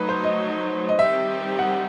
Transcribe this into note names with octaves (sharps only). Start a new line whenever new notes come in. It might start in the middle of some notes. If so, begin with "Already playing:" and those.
Already playing: F#3 A3 D#4 B4
C5
D#5
D#5
D#3 G3 C4 D#4 G4 E5
F#5